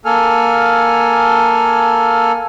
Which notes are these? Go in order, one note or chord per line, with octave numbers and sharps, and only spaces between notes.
A#3 A4 G#5 F6